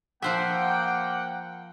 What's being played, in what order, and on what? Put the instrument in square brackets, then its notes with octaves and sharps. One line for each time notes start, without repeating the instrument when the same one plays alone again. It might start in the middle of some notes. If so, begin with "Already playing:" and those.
[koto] F3 C5 E5 [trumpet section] A#3 G5 [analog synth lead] F#5